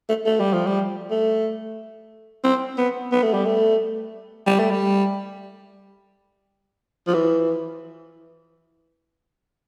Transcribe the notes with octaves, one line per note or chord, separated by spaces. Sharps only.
A3
A3
G3
F3
G3
A3
C4
B3
B3
A3
G3
A3
G3
A3
G3
F3
E3